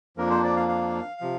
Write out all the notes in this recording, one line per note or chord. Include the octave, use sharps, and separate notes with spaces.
F2 F3 A#3 D4 A#4
C5
D5
F5
F5
C3 F3